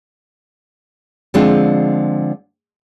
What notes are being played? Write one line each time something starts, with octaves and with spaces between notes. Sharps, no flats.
D3 F3 G#3 C4 D4 F4